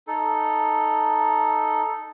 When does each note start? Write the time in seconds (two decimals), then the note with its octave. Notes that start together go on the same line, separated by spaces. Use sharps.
0.07 D#4 A4